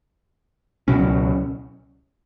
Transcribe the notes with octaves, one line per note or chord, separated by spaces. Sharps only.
C#2 B2 F#3 C#4